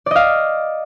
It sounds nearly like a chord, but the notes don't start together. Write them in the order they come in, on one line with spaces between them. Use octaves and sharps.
D5 D#5 F5